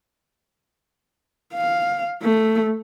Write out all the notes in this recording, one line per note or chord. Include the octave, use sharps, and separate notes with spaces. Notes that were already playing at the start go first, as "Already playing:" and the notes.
F5
A3